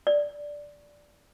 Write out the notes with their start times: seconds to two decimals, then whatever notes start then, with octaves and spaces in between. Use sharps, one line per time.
0.07 D5